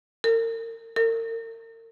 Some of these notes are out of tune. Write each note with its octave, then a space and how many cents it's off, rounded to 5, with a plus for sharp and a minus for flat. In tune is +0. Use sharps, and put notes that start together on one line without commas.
A#4 -35
A#4 -40